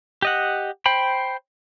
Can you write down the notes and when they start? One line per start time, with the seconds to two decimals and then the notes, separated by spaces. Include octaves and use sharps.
0.22 G4 D#5 F#5
0.86 C5 G5 B5